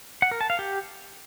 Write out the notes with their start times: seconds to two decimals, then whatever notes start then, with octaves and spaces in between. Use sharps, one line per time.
0.22 F#5
0.31 A#4
0.41 A5
0.50 F5
0.59 G4